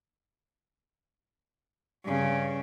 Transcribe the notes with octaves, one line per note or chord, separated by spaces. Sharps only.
G2 C#3